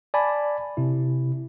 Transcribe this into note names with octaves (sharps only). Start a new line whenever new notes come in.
D5 G#5 A5 B5
C3 E4